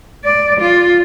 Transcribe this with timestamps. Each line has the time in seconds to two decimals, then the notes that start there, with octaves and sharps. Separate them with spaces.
0.24 D5
0.60 F4